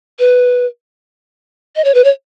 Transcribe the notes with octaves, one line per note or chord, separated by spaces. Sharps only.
B4
D#5
C#5
B4
C#5